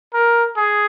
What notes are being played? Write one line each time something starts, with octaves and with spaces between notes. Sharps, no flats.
A#4
G#4